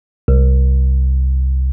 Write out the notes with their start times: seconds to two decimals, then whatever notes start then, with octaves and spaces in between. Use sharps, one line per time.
0.28 C2